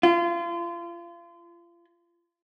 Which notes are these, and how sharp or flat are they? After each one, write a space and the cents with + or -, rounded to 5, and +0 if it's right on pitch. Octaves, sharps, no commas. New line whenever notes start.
F4 -35